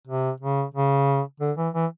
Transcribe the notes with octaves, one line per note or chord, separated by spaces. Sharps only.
C3
C#3
C#3
D3
E3
E3